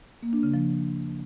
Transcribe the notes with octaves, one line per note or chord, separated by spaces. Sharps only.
A#3
D4
C#3
F3